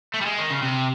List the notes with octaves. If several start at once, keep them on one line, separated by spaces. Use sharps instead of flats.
A3
G3
G#3
D#3
C#3
C3